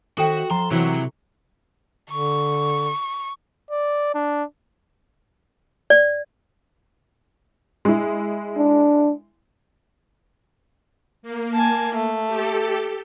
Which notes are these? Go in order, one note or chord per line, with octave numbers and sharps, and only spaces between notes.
D#3 F#4 A4 C5 E5 G5
F3 A4 A5 A#5 C6
C3 E3 F#3 E4 C#6
D3 C#6
D5
D4
D5
G#3 E4
D4
A#3
G#5 A5
A3
G4 A4